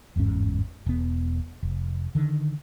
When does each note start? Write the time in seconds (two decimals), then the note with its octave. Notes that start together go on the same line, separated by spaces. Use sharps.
0.16 G1 E2 G#2 C#4
0.86 E1 B3
1.63 F1
2.15 D3 D#3